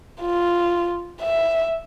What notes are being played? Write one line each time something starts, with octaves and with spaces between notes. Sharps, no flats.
F4
E5